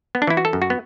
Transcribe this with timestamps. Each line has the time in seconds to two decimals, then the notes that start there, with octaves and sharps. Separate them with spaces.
0.15 B3
0.22 D4
0.27 E3 E4
0.37 F#4
0.45 A4
0.53 F#2
0.62 F#4
0.70 B3